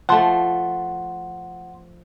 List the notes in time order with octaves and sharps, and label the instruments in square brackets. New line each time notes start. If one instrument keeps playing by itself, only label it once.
[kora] F3 A3 [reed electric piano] F#5 C6